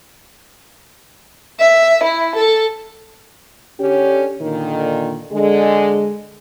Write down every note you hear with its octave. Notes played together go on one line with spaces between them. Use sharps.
E5
E4
A4
D3 C#4 G4
A#2 D3 D#3
D3 G#3